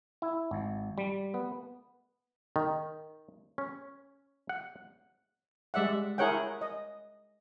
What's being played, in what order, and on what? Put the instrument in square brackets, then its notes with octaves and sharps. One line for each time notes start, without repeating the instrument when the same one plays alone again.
[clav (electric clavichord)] E4
G#1
G3
B3
D#3
C#4
F#5
[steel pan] G3 G#3 D5 E5 F#5
E4 G#4 A#4 C#5 F#5 G5
D#5